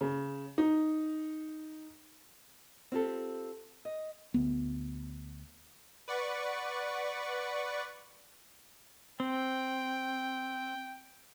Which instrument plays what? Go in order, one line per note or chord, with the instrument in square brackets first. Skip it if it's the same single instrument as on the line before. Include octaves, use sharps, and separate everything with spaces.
[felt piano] C#3
D#4
[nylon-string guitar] C4 F4 G4 A4
D#5
[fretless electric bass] D2 B3
[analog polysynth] B4 D5 F#5 C#6
[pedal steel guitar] C4 [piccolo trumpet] G5